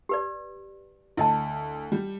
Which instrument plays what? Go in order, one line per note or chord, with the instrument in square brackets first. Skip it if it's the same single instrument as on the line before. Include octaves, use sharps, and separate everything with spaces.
[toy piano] G4 B4 D5
[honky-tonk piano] D2 [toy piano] E4 D#5 A5
[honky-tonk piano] G3